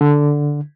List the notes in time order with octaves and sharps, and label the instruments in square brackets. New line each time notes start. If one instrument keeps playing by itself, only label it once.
[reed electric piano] D3